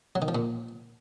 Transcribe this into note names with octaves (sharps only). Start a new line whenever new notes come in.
F#3
D#3
F3
A#2